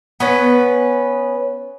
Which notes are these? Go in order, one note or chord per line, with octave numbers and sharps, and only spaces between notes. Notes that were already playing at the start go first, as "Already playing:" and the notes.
B3 C#4 B4